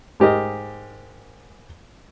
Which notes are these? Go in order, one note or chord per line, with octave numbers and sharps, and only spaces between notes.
G#2 G4 A#4 D#5